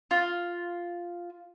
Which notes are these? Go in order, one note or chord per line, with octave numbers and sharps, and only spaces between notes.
F4